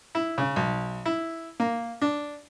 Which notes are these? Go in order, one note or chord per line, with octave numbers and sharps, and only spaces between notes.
E4
C#3
B1
E4
A#3
D4